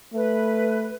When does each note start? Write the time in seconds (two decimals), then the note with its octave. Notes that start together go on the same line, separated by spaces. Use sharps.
0.14 A3 B4